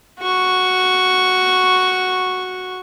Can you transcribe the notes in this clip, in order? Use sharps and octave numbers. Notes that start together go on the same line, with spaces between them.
F#4 C#6